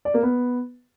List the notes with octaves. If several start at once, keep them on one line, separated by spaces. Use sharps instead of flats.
D5
A#3
B3